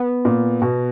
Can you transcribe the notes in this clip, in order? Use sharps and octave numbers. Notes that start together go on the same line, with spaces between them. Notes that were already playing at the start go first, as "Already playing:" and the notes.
Already playing: B3
A#2
B2